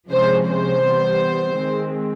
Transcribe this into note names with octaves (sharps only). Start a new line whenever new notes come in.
C3 F3 G#3 C#4 C5
C5
E3 G3 B3
D#3 G#3 C4